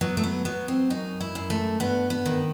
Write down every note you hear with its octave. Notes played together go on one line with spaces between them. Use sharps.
F#3 B3
A3
B3
F#3 B3
C4
F#2 D#4
E4
F#2
A3
G2 B3
B3
D#3